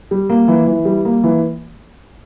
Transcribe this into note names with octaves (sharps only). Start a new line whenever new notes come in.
G3
A#3
E3
E3
G3
A#3
E3